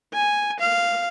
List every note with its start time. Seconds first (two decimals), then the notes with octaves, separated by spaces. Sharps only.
0.13 G#5
0.60 F5